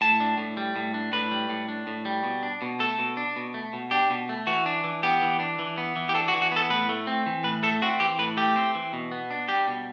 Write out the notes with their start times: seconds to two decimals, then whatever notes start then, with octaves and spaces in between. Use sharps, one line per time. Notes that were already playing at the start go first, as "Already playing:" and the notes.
0.01 A2 A5
0.20 D4
0.38 A2
0.57 G3
0.76 A2
0.94 D4
1.13 A2 B4
1.31 G3
1.49 A2
1.69 D4
1.87 A2
2.05 G3
2.24 B2
2.43 D4
2.62 B2
2.80 A3 A4
2.99 B2
3.17 D4
3.36 B2
3.54 A3
3.73 B2
3.91 D4 G4
4.10 B2
4.29 A3
4.47 E3 F#4
4.66 D4
4.84 E3
5.03 B3 G4
5.22 E3
5.40 D4
5.59 E3
5.78 B3
5.96 E3
6.09 G4
6.14 D4 A4
6.28 F#4
6.34 E3
6.42 F#4
6.52 B3 A4
6.70 A2 B4
6.89 A3
7.07 C4
7.26 E3
7.44 A2 B4
7.63 A3 A4
7.82 C4 F#4
8.00 E3 G4
8.19 A2 B4
8.37 A3 G4
8.56 C4
8.75 E3
8.93 B2
9.12 B3
9.31 D4
9.49 G3 G4
9.67 B2